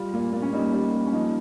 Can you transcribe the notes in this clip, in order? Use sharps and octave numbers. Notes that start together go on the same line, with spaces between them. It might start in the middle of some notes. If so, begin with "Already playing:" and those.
Already playing: G3 F4
A#2
A#2
C#4
G3 D#4
G3
A#2
C#4
F3 D#4